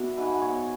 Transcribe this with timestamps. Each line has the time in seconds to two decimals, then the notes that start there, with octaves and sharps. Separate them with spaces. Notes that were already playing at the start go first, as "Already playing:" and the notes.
Already playing: B2 B3 D4 E4 F#4
0.17 G#2 B4
0.42 B3 C#5